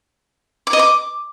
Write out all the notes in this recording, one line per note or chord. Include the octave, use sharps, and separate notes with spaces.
D6
D#5
D6